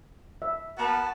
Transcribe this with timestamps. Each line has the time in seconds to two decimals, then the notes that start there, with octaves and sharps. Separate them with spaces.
0.42 E5
0.78 B3 F#4 A#4 A5